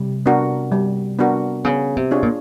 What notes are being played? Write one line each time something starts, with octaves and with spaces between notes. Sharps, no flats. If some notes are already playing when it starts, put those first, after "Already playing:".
Already playing: C3 G3
B3 D4 F#4 A#4
G3
B3 D4 F#4 A#4
C#3 B3
C3
D4 F4 G#4 C#5
A#2